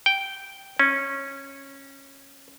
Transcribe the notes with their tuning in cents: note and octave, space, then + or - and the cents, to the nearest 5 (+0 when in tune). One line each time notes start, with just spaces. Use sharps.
G5 -5
C#4 -15